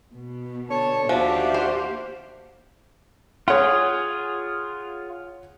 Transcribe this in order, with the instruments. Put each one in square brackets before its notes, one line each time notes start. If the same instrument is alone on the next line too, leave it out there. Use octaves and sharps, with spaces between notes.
[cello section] B2
[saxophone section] D3 C#5 [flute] A5
[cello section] D#2 G4 F5 [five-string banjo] F3 [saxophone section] D4 F#4 [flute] E5
[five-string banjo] C5
[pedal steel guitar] F4 G#4 [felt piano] C#5 F#5